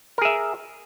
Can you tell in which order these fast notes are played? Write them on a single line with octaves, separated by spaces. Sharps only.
A#4 G#4 E5